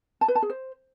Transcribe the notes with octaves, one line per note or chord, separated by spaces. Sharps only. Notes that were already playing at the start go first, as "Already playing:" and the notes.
A5
B4
A5
G#4
C5